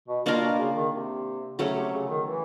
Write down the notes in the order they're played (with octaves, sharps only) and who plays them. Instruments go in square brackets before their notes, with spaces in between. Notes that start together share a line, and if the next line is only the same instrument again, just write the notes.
[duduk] B2
[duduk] B2 [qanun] A#3 D4 F4 A#4
[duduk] B2
C#3
D#3
C3
[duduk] C#3 [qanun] F#3 A3 C#4
[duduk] C3
C#3
D#3
E3